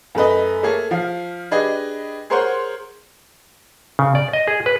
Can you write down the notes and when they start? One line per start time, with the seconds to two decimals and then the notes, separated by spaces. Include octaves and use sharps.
0.15 F#2 A3 B4 D#5
0.63 A3 A#3 G#4 A4 C#5
0.91 F3 F5
1.51 D4 G4 G#4 B4 D#5
2.30 G#4 A#4 C5 C#5 F#5 C6
3.99 C#3
4.15 D5
4.33 D#5
4.48 G#4
4.66 B4